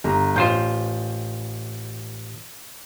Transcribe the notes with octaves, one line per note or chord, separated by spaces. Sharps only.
G1 A#5
A1 F4 C5 G6